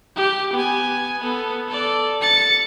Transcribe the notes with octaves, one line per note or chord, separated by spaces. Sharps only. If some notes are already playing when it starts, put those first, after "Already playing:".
G4
B3 G#5
B3 A4
A4 D5
A6 C#7